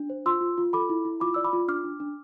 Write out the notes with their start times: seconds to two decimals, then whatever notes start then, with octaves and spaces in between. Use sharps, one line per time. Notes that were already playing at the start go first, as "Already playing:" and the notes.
Already playing: D4
0.10 C5
0.26 F4 C6 E6
0.41 F4
0.58 F4
0.73 A4 B5 D6
0.90 E4
1.05 E4
1.20 F4 B5 D6
1.34 D5 E6
1.44 B5 D6
1.53 F4
1.68 D4 D6 F6
1.84 D4
2.00 D4